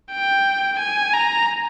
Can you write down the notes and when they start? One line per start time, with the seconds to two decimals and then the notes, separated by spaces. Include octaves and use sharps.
0.12 G5
0.80 G#5
1.14 A#5